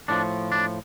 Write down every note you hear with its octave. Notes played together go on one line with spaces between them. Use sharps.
A2 F3 D4
D4